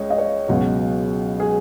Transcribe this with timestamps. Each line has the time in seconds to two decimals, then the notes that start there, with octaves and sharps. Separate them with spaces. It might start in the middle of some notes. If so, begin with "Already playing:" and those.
Already playing: C#2 C#5 D#5
0.10 D#5
0.18 C#5
0.48 C#2 B2 F#3
1.40 G#4